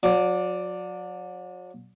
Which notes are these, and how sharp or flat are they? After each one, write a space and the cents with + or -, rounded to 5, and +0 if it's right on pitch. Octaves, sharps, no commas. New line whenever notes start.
F#3 -40 D5 +0